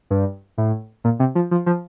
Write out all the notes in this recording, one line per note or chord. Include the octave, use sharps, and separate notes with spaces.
G2
A2
A#2
C3
F3
F3
F3